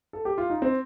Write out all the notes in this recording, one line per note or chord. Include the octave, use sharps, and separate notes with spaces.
A4
G4
F4
D#4
C4